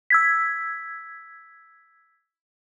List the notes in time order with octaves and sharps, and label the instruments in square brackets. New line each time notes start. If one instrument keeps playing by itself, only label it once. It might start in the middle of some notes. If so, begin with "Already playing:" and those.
[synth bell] E6 G#6 B6